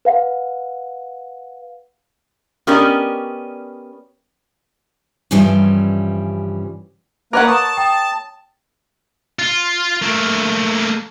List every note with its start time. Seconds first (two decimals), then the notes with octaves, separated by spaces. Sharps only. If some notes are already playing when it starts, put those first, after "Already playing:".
0.05 B4 F5 F#5
2.67 B3 C#4 G4 A#4 D5 D#5
5.31 G2 C#3 E3 F3 G3 C#4
7.33 A#3 A#4 B4 C#5 F#5 D6
7.47 A5 A#5 C#6 D#6
7.77 G5 D#6
9.39 F4
10.02 A3 A#3